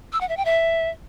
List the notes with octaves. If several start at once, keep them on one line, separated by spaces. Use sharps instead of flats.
E6
F#5
E5
G5
E5